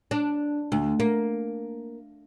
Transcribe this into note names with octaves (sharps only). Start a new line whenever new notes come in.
D4
D2
A#3